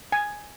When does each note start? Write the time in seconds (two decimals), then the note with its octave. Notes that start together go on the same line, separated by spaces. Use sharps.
0.12 G#5